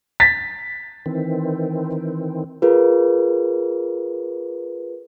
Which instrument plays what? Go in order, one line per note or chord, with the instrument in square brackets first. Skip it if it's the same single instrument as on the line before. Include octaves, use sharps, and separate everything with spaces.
[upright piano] A6 B6
[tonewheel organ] D#3 E3 C4
[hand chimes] F4 G#4 A#4 B4